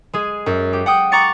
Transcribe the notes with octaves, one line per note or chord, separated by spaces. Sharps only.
G#3 G#4
F#2
G4
F#5 G5 D#6
F#5 A#5 C#6 D6 A6 C#7